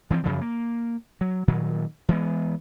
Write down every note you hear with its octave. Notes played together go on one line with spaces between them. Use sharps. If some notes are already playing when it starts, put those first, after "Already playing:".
E3 F3 A#3 C4
F#2 C#3 F3
A#3
F#3
A#2 D#3 F#3
E3 G#3 B3